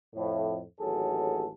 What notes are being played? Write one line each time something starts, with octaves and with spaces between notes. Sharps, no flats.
F2 A2
A1 D#2 F#3 G#4 A4